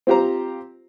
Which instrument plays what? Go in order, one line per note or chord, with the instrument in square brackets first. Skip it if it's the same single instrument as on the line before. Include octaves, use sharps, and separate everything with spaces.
[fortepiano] C4 F4 G4 C5 A#5